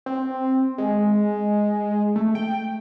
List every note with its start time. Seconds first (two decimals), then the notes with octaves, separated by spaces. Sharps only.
0.06 C4
0.78 G#3
2.16 A3
2.35 G5